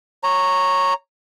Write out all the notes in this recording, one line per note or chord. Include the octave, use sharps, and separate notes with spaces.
C#5 A#5